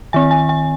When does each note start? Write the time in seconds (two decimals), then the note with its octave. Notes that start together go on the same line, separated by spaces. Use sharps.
0.13 D#3 C4 G#5
0.31 G#5
0.49 G#5